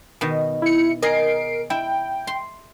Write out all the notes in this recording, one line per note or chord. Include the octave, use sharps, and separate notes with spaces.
B2 D#3
E4 C#7
G#4 A#4 D#5 C7 D7
E4 G5
C6